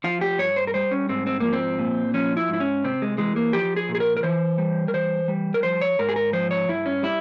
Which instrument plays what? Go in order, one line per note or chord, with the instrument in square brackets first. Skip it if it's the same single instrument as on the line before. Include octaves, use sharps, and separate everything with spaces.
[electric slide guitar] F3 F4
G4
G2 C#5
C5
A#4
G3 C5
C#4
G#2 C4
C4
F3 A#3
C4
A#2
F3 C#4
E4
G#2 E4
C#4
C3 C4
G#3
E3 G#3
A#3
F3 G4
G#4
A#2
G#4
A#4
A#4
E3 C5
G3
A#4
E3 C5
G3
A#4
F3 C5
C#5
G#2 A#4
G#4
A#4
F3 C5
C#5
G2 E4
C#4
G3 E4